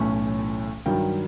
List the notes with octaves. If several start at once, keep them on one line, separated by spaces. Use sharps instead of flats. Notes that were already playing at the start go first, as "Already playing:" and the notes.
Already playing: B1 A2 E3 A3 C#4
G2 D#3 F#3 G5